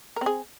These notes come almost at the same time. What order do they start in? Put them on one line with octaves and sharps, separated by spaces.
A#4 C4 G#4